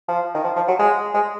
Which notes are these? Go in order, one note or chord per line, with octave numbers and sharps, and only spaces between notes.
F3
D#3
F3
F3
F#3
G#3
G#3